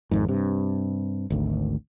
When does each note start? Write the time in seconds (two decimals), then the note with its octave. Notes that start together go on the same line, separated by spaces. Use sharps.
0.11 G#1 F2 G#2
0.28 G2 C3
1.30 G#1 D2